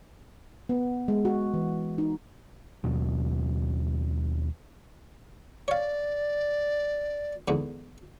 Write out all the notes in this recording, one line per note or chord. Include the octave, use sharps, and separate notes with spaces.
B3
G#3
F#4
E3
D#4
D#2 B2 F#3
C#5 D5 F5
E2 G#2 D3